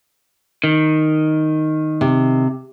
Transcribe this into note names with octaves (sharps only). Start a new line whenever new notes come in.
D#3
C3